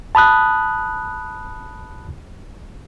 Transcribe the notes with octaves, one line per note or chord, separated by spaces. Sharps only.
A5 B5 D#6 F#6